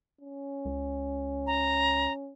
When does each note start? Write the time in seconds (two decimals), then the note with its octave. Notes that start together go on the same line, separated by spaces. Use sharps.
0.21 C#4
0.65 C#2
1.47 A#5